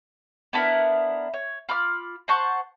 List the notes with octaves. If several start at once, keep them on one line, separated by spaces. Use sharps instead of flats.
B3 D4 E4 A#4
C#5
F4 B5 D6 F6
C5 F#5 A5 C#6